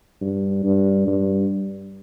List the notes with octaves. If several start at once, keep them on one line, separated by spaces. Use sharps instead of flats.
G2
G2
G2